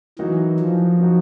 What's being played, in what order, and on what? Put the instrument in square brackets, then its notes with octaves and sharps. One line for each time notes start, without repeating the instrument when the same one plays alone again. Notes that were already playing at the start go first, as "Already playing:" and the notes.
[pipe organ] E3 [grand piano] F#3 A#3 D#4 F#4
[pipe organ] F3
[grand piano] F#3 A#3 D#4 F#4